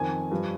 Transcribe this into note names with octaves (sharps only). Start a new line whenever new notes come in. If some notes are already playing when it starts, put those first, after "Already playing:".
Already playing: F2 D#3 G#5
G2 F3